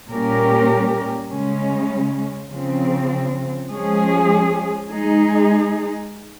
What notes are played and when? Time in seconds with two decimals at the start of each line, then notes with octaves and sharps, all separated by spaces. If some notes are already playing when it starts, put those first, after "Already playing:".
0.10 A#2 G3 C#4 G4 A#4
1.29 C#3 G#3 C#4
2.51 C#3 F3 C4
3.70 F3 G#3 C#4 G#4
4.90 G#3 D#4 G#4